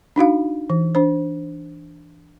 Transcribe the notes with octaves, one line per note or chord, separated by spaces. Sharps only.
D4 D#4 F#4 F5
E3
D4 C5